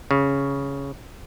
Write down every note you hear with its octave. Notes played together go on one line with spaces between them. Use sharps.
C#3